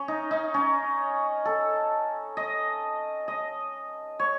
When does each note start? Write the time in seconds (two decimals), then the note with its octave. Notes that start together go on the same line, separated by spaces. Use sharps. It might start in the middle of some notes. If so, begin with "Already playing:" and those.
Already playing: C#4
0.08 D#4
0.31 D#4
0.54 C#4
1.45 A4
2.37 D#5
3.28 D#5
4.19 C#5